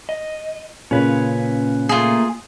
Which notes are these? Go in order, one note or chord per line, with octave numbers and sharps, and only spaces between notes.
D#5
A#2 C#3 C#4 B4 C#5
A3 A#3 F4 G#4